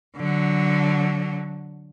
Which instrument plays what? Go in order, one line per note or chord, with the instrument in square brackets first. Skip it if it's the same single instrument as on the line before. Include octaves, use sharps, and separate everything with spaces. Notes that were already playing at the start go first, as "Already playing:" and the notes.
[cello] D3 F#3